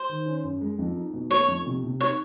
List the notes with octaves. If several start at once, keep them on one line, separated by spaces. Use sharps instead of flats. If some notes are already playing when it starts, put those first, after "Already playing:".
Already playing: C5
D#3
C#4
F#2
G#3
F2
D#4
B2
A3 C#5
F2
C3
C3
D#4 C#5